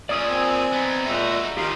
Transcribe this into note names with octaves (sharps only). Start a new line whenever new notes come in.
A#2 C#4 G#4 D5 D#6 E6
C4 G#5
B3 D#4
A#2 G#3 D#4 F#4 E5
D#2 A#2 D#4 G4 F5 C6